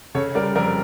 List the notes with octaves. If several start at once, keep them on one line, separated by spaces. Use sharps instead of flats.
C#3 A4 C#5
G3 A#4 D5
F2 A#4 D5